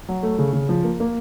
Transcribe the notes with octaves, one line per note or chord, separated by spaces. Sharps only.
F#3
A3
C#3
C#3
F3
A#3
A#3